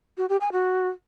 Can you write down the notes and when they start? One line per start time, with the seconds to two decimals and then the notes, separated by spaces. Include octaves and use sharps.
0.18 F#4
0.29 G4
0.41 G#5
0.52 F#4